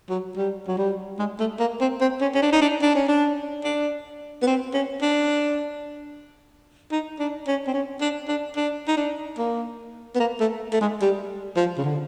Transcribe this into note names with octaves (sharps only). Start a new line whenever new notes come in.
F#3
G3
F#3
G3
G#3
A3
A#3
C4
C4
C#4
C#4
D4
D#4
D4
D4
C#4
D4
D4
B3
C4
C#4
D4
D#4
D4
C#4
C4
C#4
D4
D4
D4
D#4
D4
A#3
B3
A#3
A3
A3
G#3
G3
F3
C#3
D3